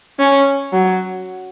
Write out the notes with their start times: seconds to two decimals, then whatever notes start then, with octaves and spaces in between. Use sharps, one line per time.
0.20 C#4
0.73 F#3